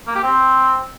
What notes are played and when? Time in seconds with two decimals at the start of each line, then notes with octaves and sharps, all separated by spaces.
0.07 A#3
0.15 G4
0.23 C4